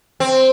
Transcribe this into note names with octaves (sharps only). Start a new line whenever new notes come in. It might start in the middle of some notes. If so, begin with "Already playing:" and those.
C4